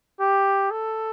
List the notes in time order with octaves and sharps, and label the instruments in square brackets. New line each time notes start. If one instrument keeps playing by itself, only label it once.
[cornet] G4
A4